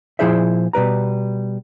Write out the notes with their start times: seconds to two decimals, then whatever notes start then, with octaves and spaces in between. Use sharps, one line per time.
0.19 A#2 F3 E4 G#4 C5 E5
0.73 B2 G3 B4 A#5